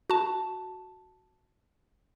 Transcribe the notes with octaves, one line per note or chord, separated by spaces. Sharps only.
F#4 A5